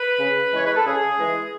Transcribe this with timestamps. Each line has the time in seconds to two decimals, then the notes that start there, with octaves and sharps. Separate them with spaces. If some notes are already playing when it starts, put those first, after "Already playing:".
Already playing: B4
0.19 C#3
0.52 E3 G#3 C#5
0.66 B4
0.76 A4
0.85 C#3 G#4
1.19 E3 G#3